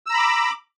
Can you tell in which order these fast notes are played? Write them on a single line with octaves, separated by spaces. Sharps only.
E6 A#5 B5 D6